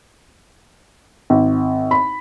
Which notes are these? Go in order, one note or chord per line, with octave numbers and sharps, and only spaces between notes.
G#1
B5